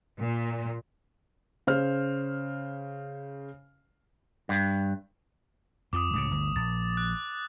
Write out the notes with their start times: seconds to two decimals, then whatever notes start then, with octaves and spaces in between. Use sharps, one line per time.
0.18 A#2
1.67 C#3 C5 F6
4.49 G2
5.93 F2 F3 D6 D#6
6.14 C#2 A2 C#3 D#6
6.31 G1 D2
6.56 A#1 A6
6.97 F#6